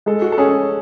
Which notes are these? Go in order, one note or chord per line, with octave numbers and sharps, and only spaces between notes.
G#3 A4
F#4
A4
C#4 G#4